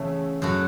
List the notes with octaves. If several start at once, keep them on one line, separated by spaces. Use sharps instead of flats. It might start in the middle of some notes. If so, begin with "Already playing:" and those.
Already playing: E2 C#3 A3
F#2 C#3 A3 F#4